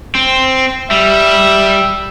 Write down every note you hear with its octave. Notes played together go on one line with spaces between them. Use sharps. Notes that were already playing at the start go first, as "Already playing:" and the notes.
C4
G3 E5